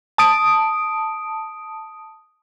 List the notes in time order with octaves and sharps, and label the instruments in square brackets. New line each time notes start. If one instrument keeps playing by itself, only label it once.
[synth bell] A5 D#6 D7